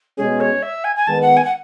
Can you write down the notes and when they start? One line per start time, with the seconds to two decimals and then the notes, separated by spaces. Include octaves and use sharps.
0.18 B2 G#3 C#4 G#4
0.40 C#5
0.62 E5
0.84 G#5
0.96 G#5
1.07 D#3 G#3 B3 A5
1.22 F#5
1.37 G#5
1.45 F#5